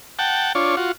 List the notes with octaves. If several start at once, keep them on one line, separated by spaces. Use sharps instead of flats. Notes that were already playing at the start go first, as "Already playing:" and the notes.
F#5 G5 A5
D4 F4 C#5
F4 F#4